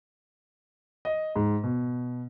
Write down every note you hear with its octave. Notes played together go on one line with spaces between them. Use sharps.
D#5
G#2
B2